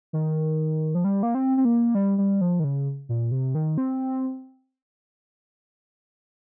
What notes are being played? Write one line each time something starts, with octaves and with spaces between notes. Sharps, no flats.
D#3
F3
G3
A#3
C4
C4
A#3
G3
G3
F3
D#3
C#3
A#2
C3
D#3
C4